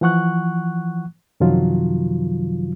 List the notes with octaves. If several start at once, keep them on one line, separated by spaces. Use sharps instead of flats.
E3 F3 F#5 C#6 F#6
F#2 C3 D#3 F3 F#3 F4